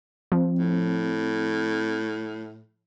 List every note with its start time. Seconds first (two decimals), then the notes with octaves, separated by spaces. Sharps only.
0.32 F3 C4
0.59 A2